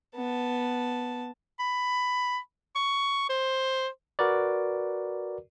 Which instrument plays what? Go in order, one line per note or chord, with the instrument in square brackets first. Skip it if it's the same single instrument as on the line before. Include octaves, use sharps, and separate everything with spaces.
[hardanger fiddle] B3 A5
[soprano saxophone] B5
C#6
C5
[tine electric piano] F#4 A#4 B4 D5